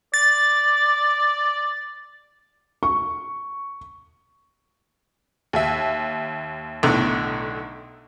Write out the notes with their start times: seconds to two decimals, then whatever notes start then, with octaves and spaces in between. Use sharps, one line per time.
0.14 D5 A6
2.83 C#6
5.53 D#2 E5
6.83 B1 A2 D3